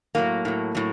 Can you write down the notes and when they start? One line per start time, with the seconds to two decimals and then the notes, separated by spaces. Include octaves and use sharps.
0.15 A2 F#3 A#3
0.45 A2 F#3
0.75 A2 F#3